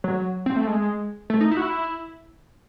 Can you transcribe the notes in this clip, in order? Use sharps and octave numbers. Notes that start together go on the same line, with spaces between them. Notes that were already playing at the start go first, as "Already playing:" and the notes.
F#3
C4
A3
G#3
A3
D#4
E4
F#4
E4